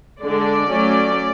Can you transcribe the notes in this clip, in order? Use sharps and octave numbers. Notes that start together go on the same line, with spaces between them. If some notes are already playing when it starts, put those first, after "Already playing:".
D3 G#3 D4 D5
F#3 A3 C#4